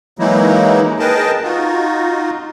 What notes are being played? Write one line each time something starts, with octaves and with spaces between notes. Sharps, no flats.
E3 F#3 G#3 A#3 D#4 E4
G#4 A#4 B4 D#5 G5 A5
D#4 F4 F#4